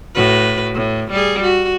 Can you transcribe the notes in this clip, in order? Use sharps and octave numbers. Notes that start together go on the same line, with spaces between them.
A2 F#4 B4
A2
G3 G#4
F#4